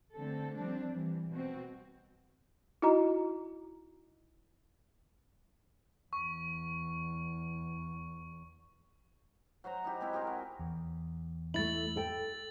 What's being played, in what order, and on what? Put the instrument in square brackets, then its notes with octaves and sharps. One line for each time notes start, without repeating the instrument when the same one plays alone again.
[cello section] D3 A3 C4 A4
F3 G3 C4 D4
E3 G3
B2 C4 F#4
[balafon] D#4 E4 F#4 D#5 A#5
[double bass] E2 [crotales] C#6
[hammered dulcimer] F#3 F#4 C5 A#5
D#4 E4 G4
G#3 C4 E4 F#4
C4 G4 G#4 A#4
F#4
[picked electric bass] E2
[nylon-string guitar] A3 E4 [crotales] A6 F#7
[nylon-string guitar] A4 G5